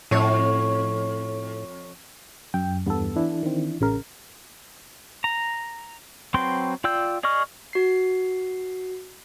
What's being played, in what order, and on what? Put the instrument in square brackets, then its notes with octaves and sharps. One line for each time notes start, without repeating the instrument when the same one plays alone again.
[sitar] F2 C#5 [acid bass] A2
[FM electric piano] F#2 [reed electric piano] G5
[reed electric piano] E2 G2 [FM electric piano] B3 A4
[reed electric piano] E3 D4 E4
[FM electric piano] D#3 C4
A1 C#3 A#4
[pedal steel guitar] A#5
F#3 C4 B4 G5 C6
F4 D5 G5 E6 G6
G#4 D5 D#5 C#6 F6
[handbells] F#4 C7